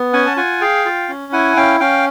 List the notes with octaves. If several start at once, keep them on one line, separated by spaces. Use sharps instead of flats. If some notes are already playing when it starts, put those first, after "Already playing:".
Already playing: B3
C#4 F#5 G#5
A5
F4 F#5 G#5
G#4 F5 G5
F4
C#4
E4 F#5 G#5
C#4 F5 G5
C#4 F5 G5